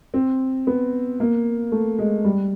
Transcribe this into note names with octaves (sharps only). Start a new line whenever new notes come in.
C4
B3
A#3
A3
G#3
G3